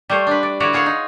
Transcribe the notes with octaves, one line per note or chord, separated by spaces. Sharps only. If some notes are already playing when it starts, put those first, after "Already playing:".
G3 A3 C5 C#5
D4 B4
D5
D3 E4 F#4 C#5 D5 F#5
F4 G#4 C#5 F#5 G#5
D#4